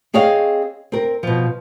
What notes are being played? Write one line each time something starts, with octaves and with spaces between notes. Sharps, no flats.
C4 G#4 C#5 D#5 F5
C4 A#4
B2 F3